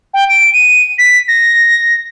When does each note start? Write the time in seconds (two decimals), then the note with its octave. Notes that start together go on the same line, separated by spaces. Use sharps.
0.13 G5
0.29 D7
0.53 D#7
0.98 B6
1.28 A#6